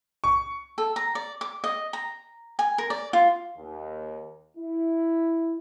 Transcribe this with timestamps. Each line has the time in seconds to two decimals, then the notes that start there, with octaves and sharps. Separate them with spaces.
0.24 C#6
0.78 A4
0.96 A#5
1.15 D5
1.41 D6
1.64 D#5
1.93 A#5
2.59 G#5
2.78 A#4
2.90 D5
3.13 F4
3.57 D#2
4.57 E4